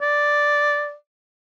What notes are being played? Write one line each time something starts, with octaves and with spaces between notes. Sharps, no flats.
D5